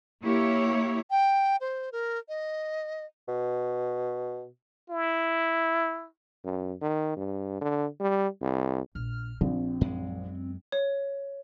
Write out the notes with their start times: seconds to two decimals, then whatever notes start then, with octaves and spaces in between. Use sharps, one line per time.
0.23 A#3 E4 G4 C#5
1.11 G5
1.61 C5
1.92 A#4
2.29 D#5
3.28 B2
4.90 E4
6.45 F#2
6.81 D#3
7.17 G2
7.61 D3
8.01 G3
8.42 C2
8.95 A#1 F6
9.41 A#1 C4 D#4
9.81 F#2 G#3
10.72 C#5